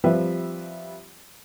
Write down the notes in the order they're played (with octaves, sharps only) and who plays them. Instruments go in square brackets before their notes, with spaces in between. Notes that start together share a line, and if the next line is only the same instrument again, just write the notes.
[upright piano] F3 G3 C4 G4 B4 E5